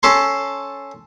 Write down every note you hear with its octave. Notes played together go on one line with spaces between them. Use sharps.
C#4 A4 A5 C6